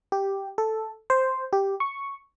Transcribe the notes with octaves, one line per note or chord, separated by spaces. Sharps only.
G4
A4
C5
G4
C#6